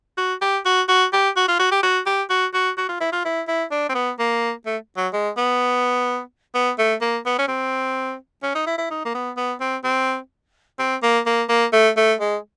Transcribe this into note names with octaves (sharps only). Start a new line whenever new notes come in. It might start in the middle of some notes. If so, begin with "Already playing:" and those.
F#4
G4
F#4
F#4
G4
F#4
F4
F#4
G4
F#4
G4
F#4
F#4
F#4
F4
E4
F4
E4
E4
D4
C4
B3
A#3
A3
F#3
G#3
B3
B3
A3
A#3
B3
C#4
C4
C#4
D#4
E4
E4
D#4
A#3
B3
B3
C4
C4
C4
A#3
A#3
A#3
A3
A3
G#3